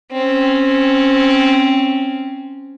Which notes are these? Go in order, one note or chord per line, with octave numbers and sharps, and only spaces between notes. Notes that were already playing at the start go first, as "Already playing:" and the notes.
C4 C#4